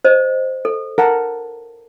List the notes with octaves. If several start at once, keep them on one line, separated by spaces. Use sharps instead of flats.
C5 D#5
A4
A#4 F#5 A5